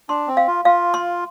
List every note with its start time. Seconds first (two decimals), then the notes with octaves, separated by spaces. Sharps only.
0.09 D4 C6
0.27 C4
0.37 F5
0.47 F4
0.65 F4 F5
0.94 C6